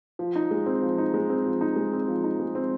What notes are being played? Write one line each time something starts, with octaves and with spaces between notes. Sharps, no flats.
F3
D#4
G#3
C4
F3
D#4
G#3
C4
F3
D#4
G#3
C4
F3
D#4
G#3
C4